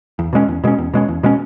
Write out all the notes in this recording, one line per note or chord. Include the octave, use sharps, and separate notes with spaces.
E2
B2 G#3 C#4
E2
B2 G#3 C#4
E2
B2 G#3 C#4
E2
B2 G#3 C#4